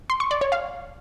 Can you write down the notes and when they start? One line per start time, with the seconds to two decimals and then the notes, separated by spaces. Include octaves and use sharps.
0.10 C6
0.20 C#6
0.31 D5
0.41 C#5
0.52 F5